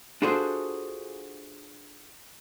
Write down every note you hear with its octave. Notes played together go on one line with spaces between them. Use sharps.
D4 F4 F#4 G#4 A4 C5